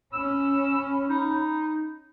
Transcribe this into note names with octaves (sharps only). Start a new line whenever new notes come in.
C#4 B5 E6
D#4